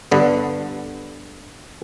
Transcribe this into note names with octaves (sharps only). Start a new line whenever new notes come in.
G2 D3 B3